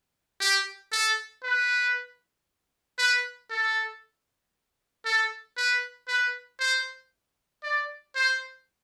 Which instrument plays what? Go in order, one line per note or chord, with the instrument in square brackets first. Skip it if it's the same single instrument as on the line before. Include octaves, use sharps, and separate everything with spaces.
[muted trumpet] G4
A4
B4
B4
A4
A4
B4
B4
C5
D5
C5